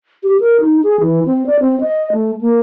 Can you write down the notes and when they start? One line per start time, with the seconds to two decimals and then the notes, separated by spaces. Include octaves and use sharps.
0.23 G4
0.40 A#4
0.60 D#4
0.84 G#4
1.01 E3
1.25 C4
1.46 D5
1.60 C4
1.81 D#5
2.12 A3
2.41 A#3